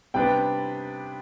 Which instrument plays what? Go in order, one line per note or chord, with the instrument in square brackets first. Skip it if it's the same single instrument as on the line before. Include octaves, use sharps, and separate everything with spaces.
[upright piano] C3 G3 B3 D4 [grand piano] G5